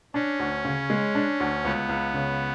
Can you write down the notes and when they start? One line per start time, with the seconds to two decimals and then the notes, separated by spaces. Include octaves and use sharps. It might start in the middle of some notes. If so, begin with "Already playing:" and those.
0.14 C#4 D4
0.39 D2
0.65 C#3
0.90 G#3
1.15 D4
1.40 D2
1.65 C#2 B3
1.89 C#2
2.14 C#3